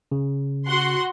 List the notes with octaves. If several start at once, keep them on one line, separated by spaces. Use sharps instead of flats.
C#3
F#4 F#5 C6